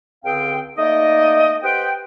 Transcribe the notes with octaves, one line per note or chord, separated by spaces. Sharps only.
C#2 D3 C4 G#4 F5 G5
A3 A#3 D#4 D5 D#5
G4 B4 C5 F#5 G5